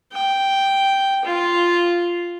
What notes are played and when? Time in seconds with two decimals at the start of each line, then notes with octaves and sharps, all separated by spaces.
0.13 G5
1.25 F4